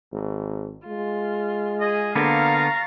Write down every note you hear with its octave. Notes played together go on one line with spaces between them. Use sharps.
G#1
G#3 F4
G#4 D#5
D3 A#3 B3 F5 A#5 C#6 A6